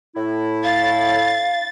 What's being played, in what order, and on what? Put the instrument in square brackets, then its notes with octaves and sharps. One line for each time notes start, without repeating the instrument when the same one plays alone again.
[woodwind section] A2 E4
[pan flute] F5 [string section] A6